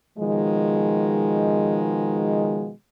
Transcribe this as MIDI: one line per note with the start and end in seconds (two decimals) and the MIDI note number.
0.18 2.70 47
0.18 2.70 51
0.18 2.70 53
0.18 2.70 56